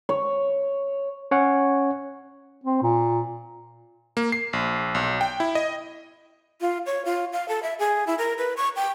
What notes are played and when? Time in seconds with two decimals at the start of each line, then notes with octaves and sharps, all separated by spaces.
0.09 C#5
1.31 C#4 C#5 F#5
2.64 C4
2.82 A#2
4.17 A#3
4.32 C7
4.53 A#1
4.95 B1
5.21 G5
5.40 E4
5.55 D#5
6.61 F4
6.86 C#5
7.05 F4
7.33 F5
7.49 A4
7.63 E5
7.79 G#4
8.07 E4
8.18 A#4
8.38 B4
8.57 C#6
8.76 G5